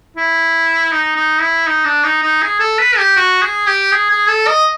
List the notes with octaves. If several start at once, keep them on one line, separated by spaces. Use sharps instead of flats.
E4
D#4
D#4
E4
D#4
D4
D#4
D#4
G#4
A4
B4
G4
F#4
G#4
G4
G#4
G#4
A4
D#5